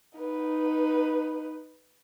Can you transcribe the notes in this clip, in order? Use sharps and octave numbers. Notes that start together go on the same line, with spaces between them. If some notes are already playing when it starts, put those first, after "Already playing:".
D#4 B4